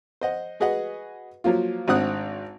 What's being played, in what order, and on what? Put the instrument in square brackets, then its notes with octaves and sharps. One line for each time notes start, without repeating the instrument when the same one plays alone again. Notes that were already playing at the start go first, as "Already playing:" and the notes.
[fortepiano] C5 D#5 F#5
F#4 G#4 B4 D#5 F#5
F3 F#3 A#3 F4
G#1 C4 D4 F#5 D#6 F#6